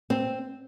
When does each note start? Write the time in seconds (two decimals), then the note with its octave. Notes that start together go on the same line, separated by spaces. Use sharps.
0.10 C4